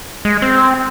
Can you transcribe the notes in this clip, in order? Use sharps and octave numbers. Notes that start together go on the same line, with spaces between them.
G#3
C4